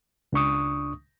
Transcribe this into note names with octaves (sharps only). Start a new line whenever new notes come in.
C#2 D4 C#6 D#6